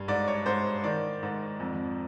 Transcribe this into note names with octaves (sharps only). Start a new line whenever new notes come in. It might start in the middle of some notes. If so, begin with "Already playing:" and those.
Already playing: G2
G#2 D5
C#5
G#2 C5
D#3 D5
G#2
F2